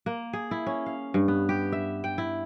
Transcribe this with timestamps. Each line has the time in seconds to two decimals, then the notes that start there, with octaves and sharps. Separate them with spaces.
0.06 A#3
0.33 G#4
0.51 E4
0.67 C#4
0.86 F5
1.14 G2
1.28 B3
1.49 G4
1.72 E5
2.04 G5
2.18 E4